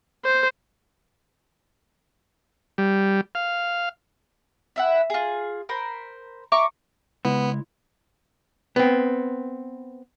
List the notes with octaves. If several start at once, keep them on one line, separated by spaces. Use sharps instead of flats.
C5
G3
F5
E4 E5 F#5
F4 G#4
A#4 C5 B5
E5 A#5 C#6 D6
C#3 G#3 B3 E4
B3 C4